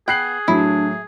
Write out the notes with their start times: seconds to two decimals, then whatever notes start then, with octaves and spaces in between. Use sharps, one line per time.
0.08 B3 G#4 G5 F#6 C7 F#7
0.48 A2 F#3 D4 E4